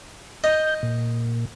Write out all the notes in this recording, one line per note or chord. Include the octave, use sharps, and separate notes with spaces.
D#5 G6
A#2